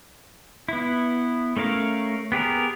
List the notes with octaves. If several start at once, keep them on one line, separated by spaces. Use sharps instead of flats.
B3 E4
A3 C#4 A#4 F5
B3 G4 G#4 A#4